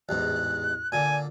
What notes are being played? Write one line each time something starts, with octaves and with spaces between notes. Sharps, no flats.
A1 E2 G#2 F#6
A#2 D3 G#5